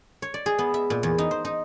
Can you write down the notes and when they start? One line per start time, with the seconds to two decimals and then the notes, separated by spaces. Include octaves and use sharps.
0.22 C#5
0.34 D5
0.46 G#4
0.59 B3
0.74 E5
0.90 A#2
1.03 E2
1.18 D#4
1.31 C5
1.45 D#4